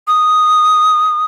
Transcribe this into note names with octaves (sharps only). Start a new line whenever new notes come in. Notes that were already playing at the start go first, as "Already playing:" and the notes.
D#6